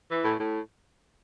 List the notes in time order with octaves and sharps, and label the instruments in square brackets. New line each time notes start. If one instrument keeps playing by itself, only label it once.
[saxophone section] E3
A2
A2